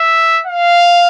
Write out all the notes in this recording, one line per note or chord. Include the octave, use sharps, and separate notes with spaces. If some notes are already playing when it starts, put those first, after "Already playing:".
Already playing: E5
F5